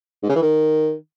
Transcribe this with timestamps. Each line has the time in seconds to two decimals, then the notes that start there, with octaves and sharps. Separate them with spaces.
0.23 G#2
0.29 C#3
0.36 E3
0.42 D#3